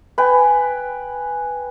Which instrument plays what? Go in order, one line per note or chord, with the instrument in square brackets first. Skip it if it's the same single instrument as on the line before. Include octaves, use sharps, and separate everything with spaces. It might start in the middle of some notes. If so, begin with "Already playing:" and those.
[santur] B4 G5 G#5